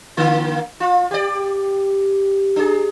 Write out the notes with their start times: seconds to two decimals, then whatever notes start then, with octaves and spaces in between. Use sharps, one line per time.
0.17 D3 A#3 F4
0.80 F4
1.11 G4 D5
2.56 D4 G#4